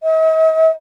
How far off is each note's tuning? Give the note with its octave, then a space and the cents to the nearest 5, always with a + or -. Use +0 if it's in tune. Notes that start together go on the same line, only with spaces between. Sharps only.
D#5 +45